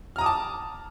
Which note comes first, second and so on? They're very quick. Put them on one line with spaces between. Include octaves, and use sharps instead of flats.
F6 A#5 D#6 D6 A5